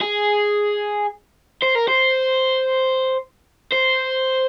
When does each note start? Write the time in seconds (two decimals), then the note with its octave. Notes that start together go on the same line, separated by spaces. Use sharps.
0.01 G#4
1.63 C5
1.76 A#4
1.88 C5
3.73 C5